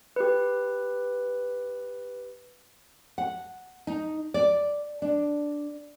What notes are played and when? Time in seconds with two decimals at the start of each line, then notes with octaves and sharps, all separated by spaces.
0.16 G4 B4
3.18 F#5
3.87 D#4
4.34 D5
5.02 D4